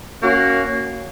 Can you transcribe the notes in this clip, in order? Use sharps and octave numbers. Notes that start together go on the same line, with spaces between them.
A#3 C#4 F#4